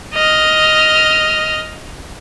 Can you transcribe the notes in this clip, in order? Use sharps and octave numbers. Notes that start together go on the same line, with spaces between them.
D#5 F6